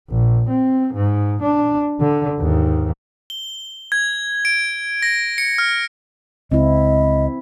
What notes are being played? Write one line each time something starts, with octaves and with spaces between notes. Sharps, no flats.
A#1
C4
G#2
D4
D3
D#2 G#2
G7
G#6
D7
A#6
C#7
F6
C#2 C4 E4 D#5